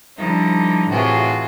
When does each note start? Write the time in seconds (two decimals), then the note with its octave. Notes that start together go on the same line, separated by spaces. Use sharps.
0.18 D3 F3 G3 D#4 E4
0.89 A2 C3 E3 F4 F#4 G#4